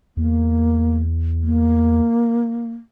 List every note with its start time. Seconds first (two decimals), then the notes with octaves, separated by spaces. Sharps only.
0.17 E2 A#3
1.43 A#3